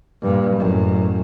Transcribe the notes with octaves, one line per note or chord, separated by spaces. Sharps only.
G2 A#2
A1 F#2